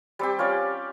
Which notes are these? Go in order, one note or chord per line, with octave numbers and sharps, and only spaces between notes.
G3 C4 G4
C#4 F4 C#5 D5